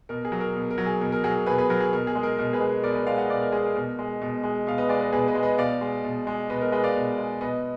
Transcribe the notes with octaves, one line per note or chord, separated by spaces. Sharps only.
B2 A#4
G#4
F#3
A#4
B2
A#4
F#3
G#4
B2 A#4
A#4
F#3 G#4
A#4
B2 G#4 B4
G#4 B4
F#3 A#4
G#4
B2 A#4
G#4
G#3
A#4
B2 A#4
G#4 B4
G#3
B2 A#4 D5
B4 D#5
G#3 D5 F5
D#5 F#5
B2 D5 F5
A#4
G#3 G#4
A#4
B2 A#4
G#3
B2
G#3
B2 F5
B4 D#5
G#3 D5 F5
B4 D#5
B2 G#4 B4
B4 D#5
G#3
B4 D#5
B2 D5 F5
G#3
B2
G#3
B2 B4 D#5
A#4
G#3 B4 D#5
D5 F5
B2
G#3
B2 B4 D#5